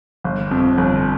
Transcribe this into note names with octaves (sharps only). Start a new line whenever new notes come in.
G1
F2
G1